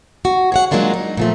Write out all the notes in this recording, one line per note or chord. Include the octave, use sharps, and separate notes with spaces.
F#4
G#4 C#5 F#5
F#3 G#3 A#3 D4 F4
D#4
A#2 F3 A3